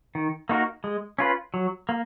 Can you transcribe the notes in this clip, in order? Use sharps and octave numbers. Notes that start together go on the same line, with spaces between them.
D#3
A#3 D#4 F#4 A#4
G#3
C#4 F4 B4
F#3
A#3